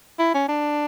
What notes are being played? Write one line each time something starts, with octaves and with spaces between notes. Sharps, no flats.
E4
C#4
D4